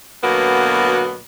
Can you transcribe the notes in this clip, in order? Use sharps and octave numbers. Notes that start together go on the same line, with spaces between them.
D2 B2 F#3 A#3 B3 F#4